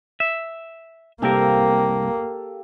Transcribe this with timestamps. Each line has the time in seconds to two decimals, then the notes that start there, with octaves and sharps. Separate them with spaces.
0.20 E5
1.22 C2 A#3 C4 G4 A4 A#4 F5